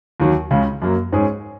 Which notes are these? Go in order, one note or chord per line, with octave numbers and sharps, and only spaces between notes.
D#2 D#3 F#3
C#2 C#3 G#3
F#2 F#3 A#3
G#2 G#3 C#4 G#4